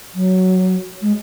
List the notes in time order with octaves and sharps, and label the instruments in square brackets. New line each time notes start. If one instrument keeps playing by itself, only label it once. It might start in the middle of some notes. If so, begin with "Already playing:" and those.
[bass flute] F#3
G#3